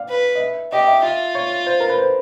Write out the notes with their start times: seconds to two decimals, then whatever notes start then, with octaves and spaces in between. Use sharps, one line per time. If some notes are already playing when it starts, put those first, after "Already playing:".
Already playing: D5 F5
0.09 B4
0.35 D#5
0.40 E5
0.72 G4 D#5
0.87 E5
1.04 F4 E5
1.35 C#5
1.66 C5
1.80 A#4
1.89 B4
1.98 C5